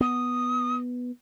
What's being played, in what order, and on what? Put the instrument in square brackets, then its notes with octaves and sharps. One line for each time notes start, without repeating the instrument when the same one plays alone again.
[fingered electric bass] B3 [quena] D#6